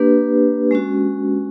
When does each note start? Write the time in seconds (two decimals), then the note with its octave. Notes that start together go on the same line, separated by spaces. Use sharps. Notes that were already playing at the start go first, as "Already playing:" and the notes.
Already playing: A#3 D4 G4 B4
0.71 G#3 C#4 F#4